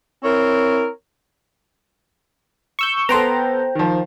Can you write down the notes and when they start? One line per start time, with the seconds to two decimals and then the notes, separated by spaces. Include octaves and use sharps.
0.24 C4 E4 A#4 C#5
2.79 C#6 E6 G6
3.09 B3 A4 C5 G5 A#5
3.75 D#3 F3